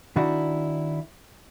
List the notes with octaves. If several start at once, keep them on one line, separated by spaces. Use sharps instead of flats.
D#3 D4 E4 F#4